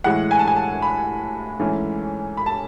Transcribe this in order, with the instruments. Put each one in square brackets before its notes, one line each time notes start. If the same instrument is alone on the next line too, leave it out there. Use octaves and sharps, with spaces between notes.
[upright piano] A2 E3 G#3 F#5
G#5
A5
G#5
A5
B5
G#2 E3 A3 C#4
B5
A5